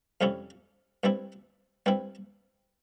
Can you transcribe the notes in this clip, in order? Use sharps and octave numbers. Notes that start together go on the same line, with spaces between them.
F2 C3 G3 C#4 E4
G2 G3 C4 E4
G2 G3 C4 E4